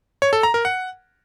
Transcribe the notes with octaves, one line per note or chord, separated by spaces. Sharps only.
C#5
A4
A#5
A#4
F#5